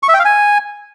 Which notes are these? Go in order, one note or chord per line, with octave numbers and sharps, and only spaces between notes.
C#6
E5
G5
F5
G#5